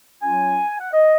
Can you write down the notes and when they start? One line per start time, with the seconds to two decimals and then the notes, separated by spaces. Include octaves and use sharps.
0.22 F#3 C#4 F4 G#5
0.79 F#5
0.93 D#5